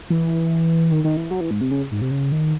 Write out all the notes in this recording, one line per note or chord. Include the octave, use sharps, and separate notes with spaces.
E3
D#3
D#3
E3
F#3
E3
G#2
C3
C#3
G#2
C3
C#3
D#3